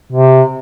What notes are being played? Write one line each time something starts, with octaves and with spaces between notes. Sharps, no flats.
C3